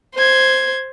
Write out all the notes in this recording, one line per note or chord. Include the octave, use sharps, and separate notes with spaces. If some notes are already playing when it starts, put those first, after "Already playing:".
C5 G#6